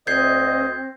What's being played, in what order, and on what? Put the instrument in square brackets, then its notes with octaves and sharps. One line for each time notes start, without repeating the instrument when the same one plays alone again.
[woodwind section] D2 D#5 [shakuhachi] C4 [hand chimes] G6 G#6 C7